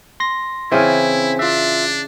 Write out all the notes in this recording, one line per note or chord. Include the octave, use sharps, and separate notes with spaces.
C6 A#6
C#3 E3 C4 E4 C5 G#5
D4 F4 E5